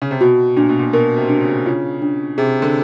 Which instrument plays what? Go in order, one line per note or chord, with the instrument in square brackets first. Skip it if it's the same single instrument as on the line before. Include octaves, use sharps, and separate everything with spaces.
[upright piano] C#3
C3
[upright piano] B2 [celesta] F#4
[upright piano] A#2 [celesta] D4
[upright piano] B2
A#2
[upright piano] B2 [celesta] A#4
[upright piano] C3
[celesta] D4
[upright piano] C#3
[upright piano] C#3 [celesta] F4
[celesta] D4
[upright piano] C3 [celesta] G#4
[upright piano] D3